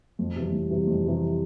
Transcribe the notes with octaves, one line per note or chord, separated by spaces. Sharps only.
F2
C3 E3 G3
F2
C3 E3 G3
F2
C3 E3 G3